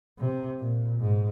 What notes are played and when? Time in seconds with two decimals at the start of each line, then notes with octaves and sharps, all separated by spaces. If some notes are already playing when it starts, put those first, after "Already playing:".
0.18 C3
0.60 A#2
1.01 G#2